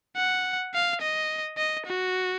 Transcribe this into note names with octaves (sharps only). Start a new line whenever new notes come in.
F#5
F5
D#5
D#5
F#4